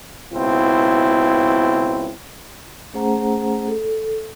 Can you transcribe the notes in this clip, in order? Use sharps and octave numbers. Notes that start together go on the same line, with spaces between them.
C#2 B2 C4 E4
A3 C#4 G#4 C5 F#5 A#5
A4